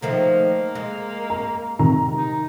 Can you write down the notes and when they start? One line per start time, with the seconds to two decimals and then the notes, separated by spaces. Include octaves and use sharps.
0.02 D#3 F3 A3 A#3
0.75 G#3
1.30 A#5
1.79 C3 D#3 A#5
2.17 D#4